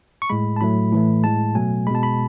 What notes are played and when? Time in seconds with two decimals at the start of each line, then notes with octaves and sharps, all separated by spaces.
0.22 C#6
0.30 A2 G#3 B5
0.56 A5
0.61 A2 F#3 A3 B5
0.92 A2 E3 A3
1.24 A2 G#3 A5
1.55 B2 F#3 A3 G#5
1.87 G#3 B5
1.91 B2 A5
2.03 B5